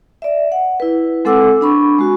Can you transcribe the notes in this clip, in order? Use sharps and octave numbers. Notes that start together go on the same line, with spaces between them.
D5 E5
F#5
E4 B4
G#3 C4 A4 F#5 D6 E6
D4 B5 C#6
G#3 F#4